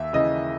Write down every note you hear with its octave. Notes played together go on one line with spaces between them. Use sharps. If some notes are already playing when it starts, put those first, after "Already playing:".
Already playing: D#2 E5
C#3 E3 D#5